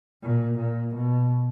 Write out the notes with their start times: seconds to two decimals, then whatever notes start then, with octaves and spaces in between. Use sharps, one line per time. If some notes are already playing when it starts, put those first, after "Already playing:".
0.23 A#2
0.58 A#2
0.95 B2